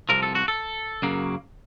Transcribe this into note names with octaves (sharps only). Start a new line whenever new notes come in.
C2 C3 F3 A#4
A4
F#4
A4
F#2 C#3 F#3 A#3